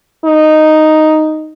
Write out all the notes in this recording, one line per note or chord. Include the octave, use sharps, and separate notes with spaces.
D#4